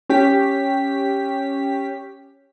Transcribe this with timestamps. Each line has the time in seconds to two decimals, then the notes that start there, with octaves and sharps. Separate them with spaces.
0.10 C#4 G4 B6